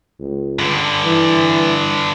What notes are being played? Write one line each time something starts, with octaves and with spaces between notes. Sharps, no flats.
C#2
G2 D3
E3